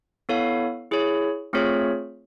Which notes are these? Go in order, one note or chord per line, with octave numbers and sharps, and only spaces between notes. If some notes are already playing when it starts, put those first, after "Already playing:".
B3 E4 A4 C#5 F5
E4 G#4 C#5
A3 C4 F4 G#4 C#5